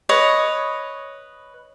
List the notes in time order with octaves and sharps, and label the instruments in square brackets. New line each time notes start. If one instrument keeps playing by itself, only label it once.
[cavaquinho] B4 C#5 D#5